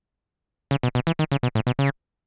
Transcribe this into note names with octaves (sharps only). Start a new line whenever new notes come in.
C#3
B2
B2
E3
D#3
C#3
B2
A2
B2
C#3